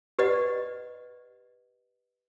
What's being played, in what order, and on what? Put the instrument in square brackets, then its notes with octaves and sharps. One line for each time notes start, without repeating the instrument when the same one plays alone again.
[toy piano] G4 B4 D5 D#5 F#5